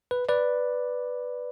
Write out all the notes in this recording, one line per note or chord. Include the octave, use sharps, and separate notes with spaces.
B4
B4 D5